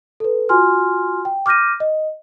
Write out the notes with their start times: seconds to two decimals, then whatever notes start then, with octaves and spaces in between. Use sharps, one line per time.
0.20 A4 B4
0.49 F4 F#4 G#5 C6 F6
1.25 G5
1.46 D6 F6 G6 A#6 D#7
1.80 D#5